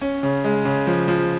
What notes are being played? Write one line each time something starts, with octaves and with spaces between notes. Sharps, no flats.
C#4
C#3
G#3
C#3
F3
F3